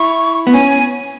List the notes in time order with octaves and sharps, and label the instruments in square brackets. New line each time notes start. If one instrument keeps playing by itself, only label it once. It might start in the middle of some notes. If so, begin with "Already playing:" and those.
Already playing: [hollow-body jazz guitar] E4 [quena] C#6
[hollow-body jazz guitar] B3
[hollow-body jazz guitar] C#4 [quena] G#5